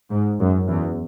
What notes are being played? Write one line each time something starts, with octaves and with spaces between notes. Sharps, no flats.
G#2
F#2
E2